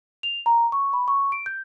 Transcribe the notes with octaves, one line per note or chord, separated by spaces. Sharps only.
F7
A#5
C#6
B5
C#6
D7
G6